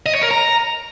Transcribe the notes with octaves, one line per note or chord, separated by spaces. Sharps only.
D#5
C#5
A#4
A#5